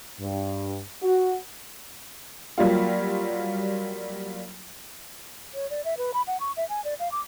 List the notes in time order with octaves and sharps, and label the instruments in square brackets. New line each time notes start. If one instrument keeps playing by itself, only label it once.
[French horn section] G2
F#4
[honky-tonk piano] F#3 G3 A#3 F4
[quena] C#5
D5
E5
B4
B5
F#5
C#6
E5
G#5
D5
F5
D6